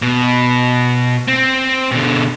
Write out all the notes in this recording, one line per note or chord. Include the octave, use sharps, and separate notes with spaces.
B2
C4
B2 D3